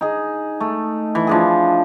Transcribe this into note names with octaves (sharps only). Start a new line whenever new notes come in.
D#4 G#4
A3
E3
F3 D4 G#4